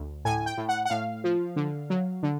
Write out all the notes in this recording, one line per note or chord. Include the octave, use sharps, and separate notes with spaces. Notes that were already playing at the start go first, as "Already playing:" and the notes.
Already playing: D2
A2 G#5
G5
A2
F#5
F#5
A2 F5
F3
D3
F#3
D3